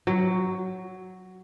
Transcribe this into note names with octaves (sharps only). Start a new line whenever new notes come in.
F#3